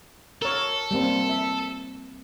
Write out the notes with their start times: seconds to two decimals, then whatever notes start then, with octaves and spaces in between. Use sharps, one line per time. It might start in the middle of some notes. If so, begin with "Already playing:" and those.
0.42 A4 A#4 C#5
0.91 G3 A#3 C4
1.29 E5